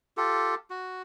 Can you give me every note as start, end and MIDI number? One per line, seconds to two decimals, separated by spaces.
0.17 0.55 65
0.17 0.55 67
0.17 0.55 69
0.70 1.02 66